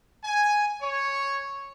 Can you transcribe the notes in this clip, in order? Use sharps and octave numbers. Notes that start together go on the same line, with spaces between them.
G#5
C#5